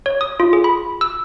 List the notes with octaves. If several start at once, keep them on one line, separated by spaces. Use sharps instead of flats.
C#5
D#6
F4
G#4
B5
E6